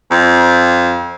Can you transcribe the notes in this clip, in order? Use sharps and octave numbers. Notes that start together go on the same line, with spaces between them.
F2